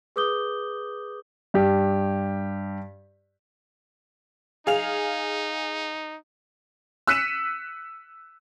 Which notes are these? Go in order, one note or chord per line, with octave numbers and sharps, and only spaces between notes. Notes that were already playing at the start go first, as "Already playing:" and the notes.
G#4 B4 D6 D#6 G6 G7
G2 G4
D#4 G#4 F5 F7
E6 F#6 B6 C#7 D#7 E7